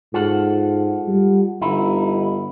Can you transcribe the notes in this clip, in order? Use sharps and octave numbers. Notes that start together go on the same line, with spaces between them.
G#2 F4 A4 F#5
G3
G1 D#4 E4